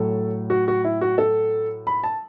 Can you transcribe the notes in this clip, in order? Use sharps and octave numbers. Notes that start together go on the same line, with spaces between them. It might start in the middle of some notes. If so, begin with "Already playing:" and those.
Already playing: A2 F#3 A4
F#4
F#4
E4
F#4
A4
B5
A5